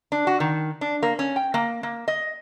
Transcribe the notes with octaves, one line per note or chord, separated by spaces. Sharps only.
D4
F#4
D#3
D4
A#3
C#4
G5
A#3
A#3
D#5